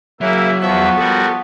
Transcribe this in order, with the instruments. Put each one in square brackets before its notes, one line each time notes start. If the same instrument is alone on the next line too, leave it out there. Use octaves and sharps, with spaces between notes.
[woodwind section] C#3 E5 [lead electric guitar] F#3 [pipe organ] A#3 E4
[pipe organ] E2 E5 [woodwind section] F3 B3 [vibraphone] F#5 A5 C#6
[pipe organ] G3 F#4 [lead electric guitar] A4 A#4